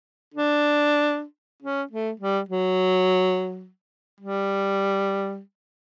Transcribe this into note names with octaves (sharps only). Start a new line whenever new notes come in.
D4
C#4
A3
G3
F#3
G3